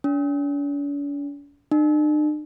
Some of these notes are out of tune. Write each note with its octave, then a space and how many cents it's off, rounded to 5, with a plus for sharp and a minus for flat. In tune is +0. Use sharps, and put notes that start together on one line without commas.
D4 -45
D4 +45